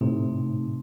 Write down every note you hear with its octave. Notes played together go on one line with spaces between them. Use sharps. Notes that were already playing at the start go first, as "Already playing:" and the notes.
A2 C3 A3 C4 D#4